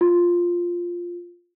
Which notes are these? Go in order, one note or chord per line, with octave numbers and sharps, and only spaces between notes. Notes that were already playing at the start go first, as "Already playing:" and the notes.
F4